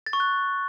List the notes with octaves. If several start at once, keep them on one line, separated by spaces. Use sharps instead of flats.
A6
C#6
F#6